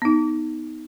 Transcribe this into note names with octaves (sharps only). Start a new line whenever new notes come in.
B3 D#4